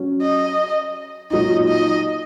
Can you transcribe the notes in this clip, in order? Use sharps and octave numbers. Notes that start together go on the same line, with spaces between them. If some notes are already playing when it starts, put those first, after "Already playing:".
Already playing: F#3 C#4
D#5
A#2 F#3 D#4 D#5
D#5